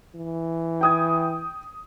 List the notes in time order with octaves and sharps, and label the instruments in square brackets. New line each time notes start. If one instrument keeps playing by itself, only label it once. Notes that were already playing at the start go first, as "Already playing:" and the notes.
[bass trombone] E3
[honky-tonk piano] G5 D#6 G#6